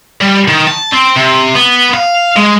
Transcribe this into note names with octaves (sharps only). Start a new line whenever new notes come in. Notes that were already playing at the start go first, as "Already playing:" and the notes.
G3
D#3
A5
C4
C3
B3
F5
G#3